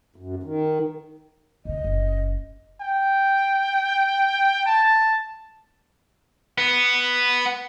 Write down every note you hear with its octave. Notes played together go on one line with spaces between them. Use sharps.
F#2
D#3
D2 C3 D#5
F#1
G5
A5
B3